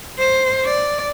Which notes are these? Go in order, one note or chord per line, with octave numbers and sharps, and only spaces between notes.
C5
D5